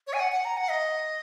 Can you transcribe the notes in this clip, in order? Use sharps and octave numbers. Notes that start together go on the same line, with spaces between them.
C#5
G#5
F#5
F#5
A#5
F#5
D#5